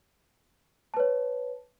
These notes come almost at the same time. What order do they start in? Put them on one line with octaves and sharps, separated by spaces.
A5 B4 C#5